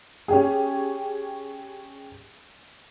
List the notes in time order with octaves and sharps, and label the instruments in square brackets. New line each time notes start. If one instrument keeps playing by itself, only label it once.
[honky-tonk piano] C#4 G4 G#4